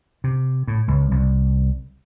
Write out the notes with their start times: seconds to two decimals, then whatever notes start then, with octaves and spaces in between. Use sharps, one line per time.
0.24 C3
0.68 A2
0.88 C#2
1.11 C2